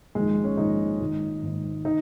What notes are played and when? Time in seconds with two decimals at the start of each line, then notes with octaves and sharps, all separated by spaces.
0.15 A#1 G#2 D#3 G#3
0.44 C#4
0.57 A#1 G#2 D#3 D#4
1.01 G#1 G#2 D#3
1.43 G#1 G#2 D#3
1.85 D#3 D#4